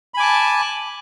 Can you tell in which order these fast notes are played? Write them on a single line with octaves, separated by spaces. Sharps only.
B5 G#5 D6 A5